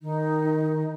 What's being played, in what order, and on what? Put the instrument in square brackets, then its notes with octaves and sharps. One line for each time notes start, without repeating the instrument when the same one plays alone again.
[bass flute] D#3 [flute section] D#4